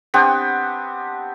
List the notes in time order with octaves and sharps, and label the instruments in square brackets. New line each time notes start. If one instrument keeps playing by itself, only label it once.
[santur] B3 C4 D4 G4